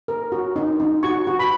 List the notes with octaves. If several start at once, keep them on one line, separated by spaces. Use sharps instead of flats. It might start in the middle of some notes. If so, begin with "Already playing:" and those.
A#4
F#4
D#4
D#4
F#4 C#6
F#4
B5